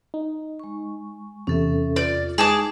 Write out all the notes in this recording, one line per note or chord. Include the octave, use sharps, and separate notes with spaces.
D#4
G#3 C#6
E2 C3 C#4 A4 E5
F4 D5
G#3 D#4 G#4 A5 D6